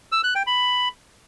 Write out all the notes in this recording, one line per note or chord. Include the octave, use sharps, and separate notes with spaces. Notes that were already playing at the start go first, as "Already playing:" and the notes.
E6
F#6
G5
B5